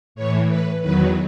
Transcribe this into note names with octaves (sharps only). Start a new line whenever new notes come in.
A2 E3 C#5
B4
E2 D#3 F#3 B4